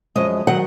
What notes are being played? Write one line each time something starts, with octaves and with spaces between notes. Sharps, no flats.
F#2 F3 G#3 D#5
D#3 F#3 F#5